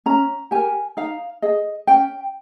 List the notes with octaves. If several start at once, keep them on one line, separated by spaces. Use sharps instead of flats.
C#4 A#5
G4 A#4 G#5
D#4 F5
G#4 D#5
C#4 G5